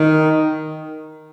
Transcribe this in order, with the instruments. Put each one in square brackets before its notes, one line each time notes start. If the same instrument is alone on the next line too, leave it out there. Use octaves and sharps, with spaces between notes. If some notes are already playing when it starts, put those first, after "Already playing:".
Already playing: [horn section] D#3